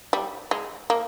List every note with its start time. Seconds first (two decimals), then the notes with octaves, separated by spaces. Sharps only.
0.13 G3
0.51 G#3
0.90 A#3